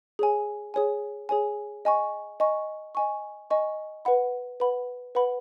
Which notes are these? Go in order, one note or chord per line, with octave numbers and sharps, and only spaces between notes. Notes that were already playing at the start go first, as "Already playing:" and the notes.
G#4 C#5 G#5
G#4 C#5 G#5
G#4 C#5 G#5
D#5 G#5 C#6
D#5 G#5 C#6
D#5 G#5 C#6
D#5 G#5 C#6
B4 F#5 B5
B4 F#5 B5
B4 F#5 B5